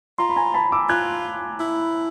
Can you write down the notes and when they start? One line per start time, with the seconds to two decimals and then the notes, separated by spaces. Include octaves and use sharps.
0.18 F4 A#5 C6
0.29 B5
0.36 G#5 A#5
0.54 A5 B5
0.72 D6 E6
0.89 F4 F#6 G#6
1.60 E4